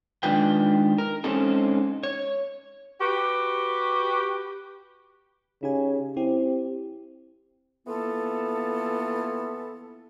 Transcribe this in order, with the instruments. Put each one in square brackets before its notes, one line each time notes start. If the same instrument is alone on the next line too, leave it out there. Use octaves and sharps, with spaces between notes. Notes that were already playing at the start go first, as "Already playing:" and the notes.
[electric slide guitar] D#3 G#3 D4 F4 B4 G5
A#4
G#3 C4 C#4 D#4 A4
C#5
[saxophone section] F#4 G4 B4
[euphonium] C#3 [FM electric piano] D#4 G4 G#5
[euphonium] C4 [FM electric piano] E4 G4
[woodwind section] E3 A#3 B3 F4 A4